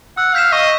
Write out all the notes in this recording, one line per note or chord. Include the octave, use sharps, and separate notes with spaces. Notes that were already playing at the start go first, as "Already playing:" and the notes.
F#5 E6
F5 G6 B6 E7
D#5 C#6